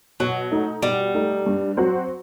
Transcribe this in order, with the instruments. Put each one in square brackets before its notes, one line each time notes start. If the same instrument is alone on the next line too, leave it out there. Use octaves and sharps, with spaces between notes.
[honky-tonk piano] B2 [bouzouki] F#3
[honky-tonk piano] A3 D#4
[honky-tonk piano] B2 [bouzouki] G3
[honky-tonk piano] A3 D#4
G2
F#3 C4 F#4 C5